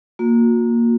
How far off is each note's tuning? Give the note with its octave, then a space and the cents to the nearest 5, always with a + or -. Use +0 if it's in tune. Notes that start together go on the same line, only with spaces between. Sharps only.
A#3 +0 F#4 -40